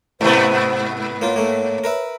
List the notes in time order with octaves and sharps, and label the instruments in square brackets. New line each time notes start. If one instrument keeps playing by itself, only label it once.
[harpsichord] A1 C3 [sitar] G#2 B3 [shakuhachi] C5
[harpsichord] A#3 F4 [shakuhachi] C#5
[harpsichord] A3 A#3
A#4 B4 E5